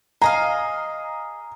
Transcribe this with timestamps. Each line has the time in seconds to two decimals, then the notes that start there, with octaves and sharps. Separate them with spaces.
0.22 G#4 D#5 F5 A#5